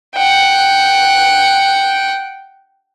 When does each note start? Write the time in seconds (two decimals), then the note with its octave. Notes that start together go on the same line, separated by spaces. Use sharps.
0.16 F#5 G5